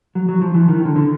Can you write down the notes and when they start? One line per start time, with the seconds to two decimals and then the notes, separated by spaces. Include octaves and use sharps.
0.15 F#3
0.29 F#3
0.42 F3
0.55 E3
0.68 D#3
0.85 D3
0.96 D3